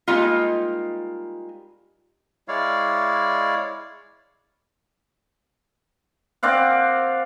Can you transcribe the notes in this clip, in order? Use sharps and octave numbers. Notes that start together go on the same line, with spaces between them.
G3 G#3 A#3 D#4 F4
G#3 E4 C#5 D5 F5
C4 D5 F5 F#5